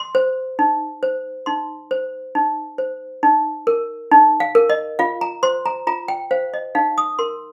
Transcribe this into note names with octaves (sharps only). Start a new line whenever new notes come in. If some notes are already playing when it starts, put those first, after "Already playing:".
Already playing: C6
C5
D#4
C5
D#4 C6
C5
D#4
C5
D#4
A#4
D#4
F5
A#4
D#5
F4 F5
A#5
C5 C6
A#5
F4 A#5
G5
C5 F5
D#5
D#4 F5
D#6
A#4 C6